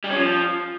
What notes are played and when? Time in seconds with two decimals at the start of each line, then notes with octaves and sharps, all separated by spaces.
0.04 G3
0.10 C#4
0.16 F3